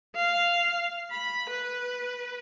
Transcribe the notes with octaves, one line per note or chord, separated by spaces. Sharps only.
F5
B5
B4